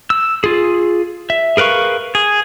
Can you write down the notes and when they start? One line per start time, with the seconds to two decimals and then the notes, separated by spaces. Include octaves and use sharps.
0.10 E6
0.44 F4 G#4
1.30 E5
1.57 G#4 A#4 B4 F5 C#6
2.15 G#4